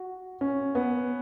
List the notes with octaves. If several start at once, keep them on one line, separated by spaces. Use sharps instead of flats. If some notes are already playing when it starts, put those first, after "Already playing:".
Already playing: F#4
C#4
B3